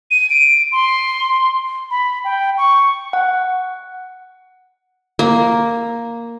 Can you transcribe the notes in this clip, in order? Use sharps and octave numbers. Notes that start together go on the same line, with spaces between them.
D#7
D7
C6
B5
G5
C#6
F#5
A#3